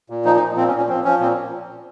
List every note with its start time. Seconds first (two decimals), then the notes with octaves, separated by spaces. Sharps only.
0.10 A#2
0.25 F3 D#4
0.36 D#4
0.41 F3
0.56 A#2 C4
0.67 C#4
0.73 A#2
0.78 C#4
0.89 F3 C4
1.04 F3 C#4
1.20 A#2 C4